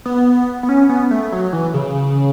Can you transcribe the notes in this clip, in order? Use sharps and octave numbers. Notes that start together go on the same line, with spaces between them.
B3
B3
C#4
B3
A3
F#3
E3
C#3